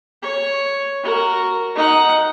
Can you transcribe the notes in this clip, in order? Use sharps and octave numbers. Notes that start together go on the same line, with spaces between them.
C#5
F#4 A#4
D#4 F#5